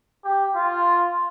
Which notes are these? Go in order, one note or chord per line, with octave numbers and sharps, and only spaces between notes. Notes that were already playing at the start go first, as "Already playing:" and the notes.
G4
F4